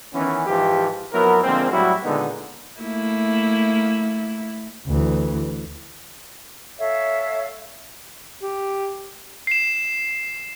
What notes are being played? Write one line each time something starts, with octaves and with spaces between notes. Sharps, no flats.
D#3 E3 B3 C#4
G#2 E3 F3 G4
F2 F#3 B3 E4 A#4
D3 F3 G#3 A#3 C4
A2 F#3 G3 E4 F#4
A#2 D3 D#3 G#3 B3 D#4
A3 A#3 E4
D2 E3
A4 C#5 E5 F5
G4
C7 E7